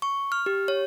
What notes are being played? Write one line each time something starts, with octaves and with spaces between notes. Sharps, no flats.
C#6
F6
G4
C#5